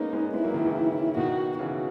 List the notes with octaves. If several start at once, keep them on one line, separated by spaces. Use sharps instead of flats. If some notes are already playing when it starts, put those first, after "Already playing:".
Already playing: G#3 A#3 B3 C#4 D#4
G#3 B3
G#3 B3 E4
F#3 A#3
D#3 F#3
C#3 E3
B2 D#3 F#4
C#3 E3 F#4